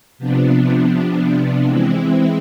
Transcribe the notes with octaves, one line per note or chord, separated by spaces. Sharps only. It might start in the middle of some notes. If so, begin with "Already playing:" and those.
C3 F3 B3 D4
E3 G#3 C4 E4